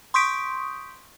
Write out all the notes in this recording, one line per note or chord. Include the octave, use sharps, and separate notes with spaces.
C6 C#6 D#6 G6 B6 D7